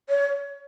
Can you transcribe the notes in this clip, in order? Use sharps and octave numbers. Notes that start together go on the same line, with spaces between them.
C#5